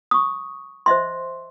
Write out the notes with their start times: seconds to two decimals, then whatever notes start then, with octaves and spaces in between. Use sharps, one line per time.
0.11 C#6 D#6
0.86 C5 D#5 E5 C6